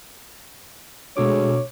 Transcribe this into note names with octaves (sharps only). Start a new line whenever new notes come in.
D2 B2 G#3 C#5 D6